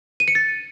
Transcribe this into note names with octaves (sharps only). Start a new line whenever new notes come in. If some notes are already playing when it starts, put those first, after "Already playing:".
D#7
C#7
A6